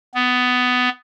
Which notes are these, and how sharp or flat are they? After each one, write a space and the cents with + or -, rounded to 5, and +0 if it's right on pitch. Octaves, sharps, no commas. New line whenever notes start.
B3 +15